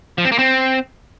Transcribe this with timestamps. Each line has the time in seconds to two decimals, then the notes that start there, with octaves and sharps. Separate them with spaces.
0.18 F3
0.25 C4
0.32 A#3
0.39 C4